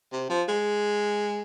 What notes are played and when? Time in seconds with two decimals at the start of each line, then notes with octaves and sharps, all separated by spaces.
0.12 C3
0.30 F3
0.49 G#3